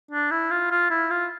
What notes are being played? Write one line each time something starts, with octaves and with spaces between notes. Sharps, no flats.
D4
E4
F4
F4
E4
F4